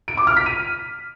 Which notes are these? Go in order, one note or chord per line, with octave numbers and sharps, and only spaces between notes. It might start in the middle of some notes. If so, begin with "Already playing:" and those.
D7
D6
F6
B6
D#7